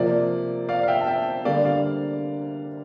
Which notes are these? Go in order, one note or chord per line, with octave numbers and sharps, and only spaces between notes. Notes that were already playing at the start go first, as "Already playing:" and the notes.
Already playing: C3 F3 A#3 D5
D5 F5
F5
E5 G5
A5
E5 G5
D3 G3 A#3 D5 F5
D5 F5